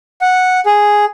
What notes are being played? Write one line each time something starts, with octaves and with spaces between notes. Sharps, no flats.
F#5
G#4